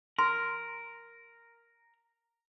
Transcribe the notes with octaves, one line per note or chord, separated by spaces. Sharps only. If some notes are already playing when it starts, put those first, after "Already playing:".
A#4 C6